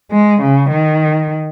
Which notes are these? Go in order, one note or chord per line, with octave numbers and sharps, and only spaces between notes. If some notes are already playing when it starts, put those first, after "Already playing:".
G#3
C#3
D#3